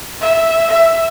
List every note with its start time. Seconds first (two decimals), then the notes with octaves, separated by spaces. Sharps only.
0.21 E5
0.70 E5